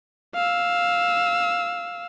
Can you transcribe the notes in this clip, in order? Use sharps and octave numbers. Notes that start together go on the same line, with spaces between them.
F5 E6